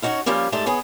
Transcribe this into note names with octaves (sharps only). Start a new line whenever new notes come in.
C#4 D#4 F#4 C#5 F#5
F3 G3 A#3 C#4 G4
G#2 A3 D4 G4 A5
B3 G#4 C#5